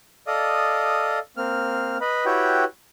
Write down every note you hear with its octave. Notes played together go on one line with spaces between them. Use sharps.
A4 D5 D#5 F5 D#6
A#3 C4 F6
B4 D#5 B5
E4 F#4 G4 B4 C#5 G5